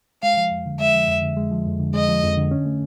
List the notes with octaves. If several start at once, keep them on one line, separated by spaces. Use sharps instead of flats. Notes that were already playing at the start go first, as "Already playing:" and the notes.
G#3 F5
F3
F2
D3
G#3 E5
F3
F2
D3
G#3
F3
F2
D3
G#3 D#5
F3
F2
D3
C#4
A3